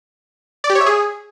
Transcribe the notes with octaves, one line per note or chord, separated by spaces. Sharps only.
D5
G4
C#5
E5
G#4